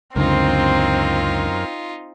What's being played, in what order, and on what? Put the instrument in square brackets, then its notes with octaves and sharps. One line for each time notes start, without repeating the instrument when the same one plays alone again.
[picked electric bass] C#2 D3 [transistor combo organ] F#2 A#4 [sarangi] C4 [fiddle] D#4 F4